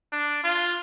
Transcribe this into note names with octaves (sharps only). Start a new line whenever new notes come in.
D4
F4